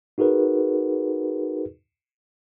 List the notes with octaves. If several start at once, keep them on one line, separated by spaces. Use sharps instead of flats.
D#4 F#4 G#4 A#4 B4